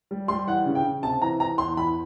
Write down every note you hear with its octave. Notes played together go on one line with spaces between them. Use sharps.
G3
G3 C6
E3 F#5
C#3
G5
C#3
C3 A5
E3 A#5
E3 A#5
E2 C6
E3 B5